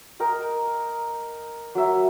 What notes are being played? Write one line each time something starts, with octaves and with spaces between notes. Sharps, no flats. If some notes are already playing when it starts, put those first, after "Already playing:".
A#4 D#5 G5
F#3 A#4 E5